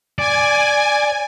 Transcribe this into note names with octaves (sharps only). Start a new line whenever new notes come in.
D5 G#5